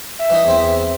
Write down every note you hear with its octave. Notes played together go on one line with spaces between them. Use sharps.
E5
E3 D#4
E2 C4